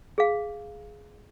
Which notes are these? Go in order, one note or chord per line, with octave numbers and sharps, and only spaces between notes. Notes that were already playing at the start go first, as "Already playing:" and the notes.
G#4 F5